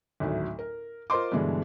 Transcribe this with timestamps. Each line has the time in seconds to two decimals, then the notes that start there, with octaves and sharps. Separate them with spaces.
0.20 G#1 D2 A2 F#3
0.59 A#4
1.10 F4 A#4 C5 D#5 C6 D6
1.32 G2 B2 D3 E3 G#3